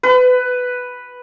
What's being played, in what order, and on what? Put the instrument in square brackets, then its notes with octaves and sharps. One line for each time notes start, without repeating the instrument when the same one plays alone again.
[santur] B4